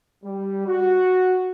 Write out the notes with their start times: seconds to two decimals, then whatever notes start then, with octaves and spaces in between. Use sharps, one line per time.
0.24 G3
0.68 F#4